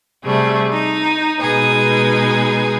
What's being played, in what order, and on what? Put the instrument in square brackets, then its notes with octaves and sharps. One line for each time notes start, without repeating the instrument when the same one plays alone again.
[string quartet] C3 G3 A3 G#4
D#4
B2 G#3 D#4 G#4 B4